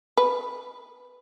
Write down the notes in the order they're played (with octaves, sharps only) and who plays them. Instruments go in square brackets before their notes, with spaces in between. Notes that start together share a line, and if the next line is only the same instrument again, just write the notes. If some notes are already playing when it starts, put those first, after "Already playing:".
[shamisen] B4